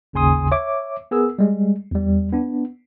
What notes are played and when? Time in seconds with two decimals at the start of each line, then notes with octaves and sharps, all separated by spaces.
0.13 G#1 D#2 C#3 G#5 C6 D#6
0.52 C#5 E5 D6
1.11 B3 G#4 A#4 E6
1.39 G3 G#3
1.91 E2 G3
2.33 B3 D4